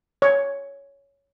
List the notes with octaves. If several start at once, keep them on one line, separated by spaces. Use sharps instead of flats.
C#5